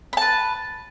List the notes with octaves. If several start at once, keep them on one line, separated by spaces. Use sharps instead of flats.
B4 A5 B5